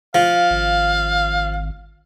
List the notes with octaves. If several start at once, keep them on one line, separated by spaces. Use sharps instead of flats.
F3 F5
G#1